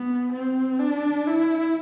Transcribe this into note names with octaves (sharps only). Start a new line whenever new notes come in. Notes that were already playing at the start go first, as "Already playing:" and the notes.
Already playing: B3
C4
D4
E4